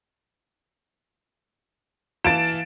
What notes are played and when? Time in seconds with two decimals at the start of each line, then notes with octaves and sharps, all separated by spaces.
2.25 E3 F5 A5 A6 D7 E7